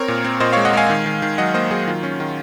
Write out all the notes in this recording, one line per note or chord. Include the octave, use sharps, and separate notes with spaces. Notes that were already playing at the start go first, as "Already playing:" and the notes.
Already playing: C4 A#4 C#5
A#2
C4
A#2 C5 D#5
G#3 C#5 F5
D#5 F#5
G#3 F5 G#5
D#3
D#3
D#3
F#3 D#5 F#5
A#3 C5 D#5
F#3 G#4 C5
D#3 F4
C#4
D#3